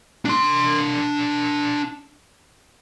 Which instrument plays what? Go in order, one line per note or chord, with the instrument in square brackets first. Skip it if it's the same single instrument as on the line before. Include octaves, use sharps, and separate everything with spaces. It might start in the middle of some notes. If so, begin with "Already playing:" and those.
[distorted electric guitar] D4 C6